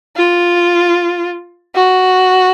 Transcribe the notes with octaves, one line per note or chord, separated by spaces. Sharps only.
F4
F#4